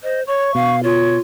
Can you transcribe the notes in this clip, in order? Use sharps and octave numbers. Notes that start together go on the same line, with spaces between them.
C5 D#5
C#5 C#6
B2 F5
F4 C#5